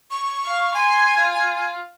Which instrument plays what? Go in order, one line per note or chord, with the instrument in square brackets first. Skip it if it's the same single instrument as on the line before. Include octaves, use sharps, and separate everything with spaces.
[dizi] C#6
[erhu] F5
[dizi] G#5 [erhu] C6
[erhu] F4